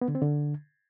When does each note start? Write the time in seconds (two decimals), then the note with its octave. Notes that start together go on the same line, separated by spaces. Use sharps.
0.02 B3
0.08 D3
0.15 C4
0.22 D3